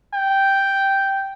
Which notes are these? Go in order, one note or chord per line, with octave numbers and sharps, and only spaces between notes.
G5